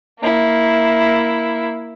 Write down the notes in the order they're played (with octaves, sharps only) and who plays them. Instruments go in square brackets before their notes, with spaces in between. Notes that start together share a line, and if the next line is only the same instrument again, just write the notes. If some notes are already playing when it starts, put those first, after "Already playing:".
[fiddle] A#3 E4